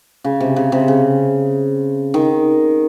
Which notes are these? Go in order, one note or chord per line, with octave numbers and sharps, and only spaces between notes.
C#3
C3
C#3
C3
C#3
D#3